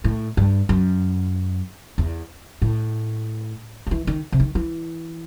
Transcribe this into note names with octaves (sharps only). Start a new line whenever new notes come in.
A2
G2
F#2
E2
A2
F#3
E3
D#3
C3
D#3
E3